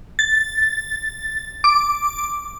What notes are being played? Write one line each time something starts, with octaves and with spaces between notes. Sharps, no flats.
A6
D6